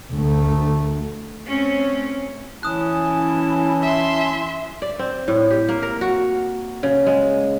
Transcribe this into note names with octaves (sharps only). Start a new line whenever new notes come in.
D2 A3
A3 C4 C#4
E3 C#4 E4 A5 D#6 F#6
E5 C6
D5
C4
A2
G4
A#3
A#4
F#4
C#3
G#3